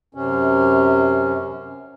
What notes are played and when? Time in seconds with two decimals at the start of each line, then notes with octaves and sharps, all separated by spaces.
0.15 F#2 C3 C#4